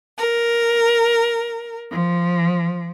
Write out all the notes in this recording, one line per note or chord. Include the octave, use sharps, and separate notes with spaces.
A#4
F3